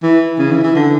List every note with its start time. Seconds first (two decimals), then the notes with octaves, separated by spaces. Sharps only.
0.03 E3
0.39 C#3
0.52 E3
0.63 E3
0.75 D3